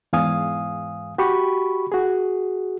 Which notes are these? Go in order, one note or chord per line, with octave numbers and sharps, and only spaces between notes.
E2 G#2 F5 G#5 D#6
F#4 G4 B5 C#6
F#4 G#4